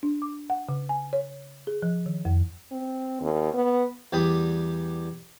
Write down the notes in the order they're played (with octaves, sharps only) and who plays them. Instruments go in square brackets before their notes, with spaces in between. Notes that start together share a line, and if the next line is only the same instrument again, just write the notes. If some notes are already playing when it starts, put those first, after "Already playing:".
[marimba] D4
D6
F#5
C#3
G#5
C#5
G#4
F3
D#3
F2
[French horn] C4
D#2
B3
[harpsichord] E2 G3 G4 D5 B5 D#6